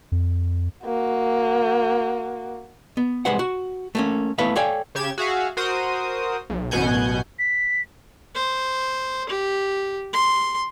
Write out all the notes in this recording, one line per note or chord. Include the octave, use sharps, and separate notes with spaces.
F2
A#3 F#4
B3
C2 G#3 B4 C5 F#5
F#4
A3 A#3 C#4
A3 B3 E4 B4 C#5 F5
A4 C#5 D5 F5 G5 G#5
C#3 G4 G#6 E7
F#4 G#4 E5 F5
F#4 A#4 C5 D#6
B1
A1 F#2 B2 F#5 G#5 G6
B6
C5
G4
C6